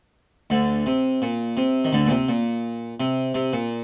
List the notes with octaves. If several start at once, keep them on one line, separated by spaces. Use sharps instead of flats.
D2 D3
C3
A#2
C3
D#3
D2 D3
A#2
C3
A#2
C3
C3
A#2